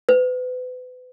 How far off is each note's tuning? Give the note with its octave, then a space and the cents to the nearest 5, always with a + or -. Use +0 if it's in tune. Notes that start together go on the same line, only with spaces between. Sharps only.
B4 +35